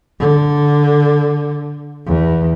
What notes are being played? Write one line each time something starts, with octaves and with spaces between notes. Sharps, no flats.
D3
E2